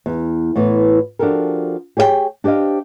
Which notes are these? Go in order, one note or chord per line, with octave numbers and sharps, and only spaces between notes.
E2
A2 E3 B3
F3 D4 F#4 G4 A4 A#4
G4 G#4 C#5 D5 G5
D4 G4 C5 D#5 F5